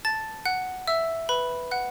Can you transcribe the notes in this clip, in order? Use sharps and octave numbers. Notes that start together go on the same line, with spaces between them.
A5 A6
F#5 F#6
E5 E6
B4 B5
F#5 F#6